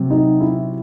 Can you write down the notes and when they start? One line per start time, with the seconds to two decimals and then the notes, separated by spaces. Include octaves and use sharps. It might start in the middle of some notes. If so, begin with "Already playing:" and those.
Already playing: C3 F#3 C4
0.10 D#4
0.40 E4